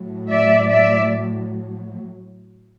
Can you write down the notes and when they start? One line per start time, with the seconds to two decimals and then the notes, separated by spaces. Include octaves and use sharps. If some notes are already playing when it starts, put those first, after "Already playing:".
Already playing: A2 F#3
0.30 D5 E5
0.69 D5 E5